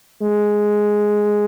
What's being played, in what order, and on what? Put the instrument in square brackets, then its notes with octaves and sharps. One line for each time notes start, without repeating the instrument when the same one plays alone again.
[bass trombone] G#3